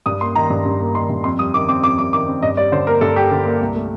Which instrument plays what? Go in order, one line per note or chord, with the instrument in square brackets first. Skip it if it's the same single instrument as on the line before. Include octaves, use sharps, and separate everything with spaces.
[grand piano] G2 D#6
A#3 C6
D#3 A#5
G2
G2
A#3
D#3 C6
G2
F2 C6
G3 D#6
D#3 D6
C4 D6
F2 D6
G3 D6
D#3 D6
C4
G2 D#5
G3 D5
D3 C5
A#3 A#4
G2 A4
G3 G4
D3 A4
A#3
C2
A3